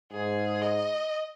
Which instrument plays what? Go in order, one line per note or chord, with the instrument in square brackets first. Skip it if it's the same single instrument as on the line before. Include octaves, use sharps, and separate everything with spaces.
[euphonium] G#2 [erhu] G#4
[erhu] D#5